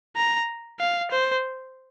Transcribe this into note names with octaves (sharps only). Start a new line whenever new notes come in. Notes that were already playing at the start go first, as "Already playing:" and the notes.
A#5
F5
C5